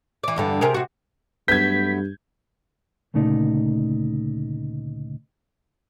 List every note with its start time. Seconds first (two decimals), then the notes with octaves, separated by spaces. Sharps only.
0.24 E3 D5
0.36 E2 G2 D3
0.61 C3 G#4 A#4
0.74 C3 F#4
1.48 G2 F#3 A3 B3 G6 G#6 B6
3.14 D2 A#2 C#3 A3 D#4 D5